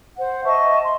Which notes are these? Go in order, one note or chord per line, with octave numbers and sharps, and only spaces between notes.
C5 F#5
D#5 E5 A5 C#6
C6